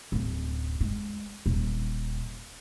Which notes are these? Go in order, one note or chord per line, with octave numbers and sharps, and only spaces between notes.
D1 F#2
G#3
D#1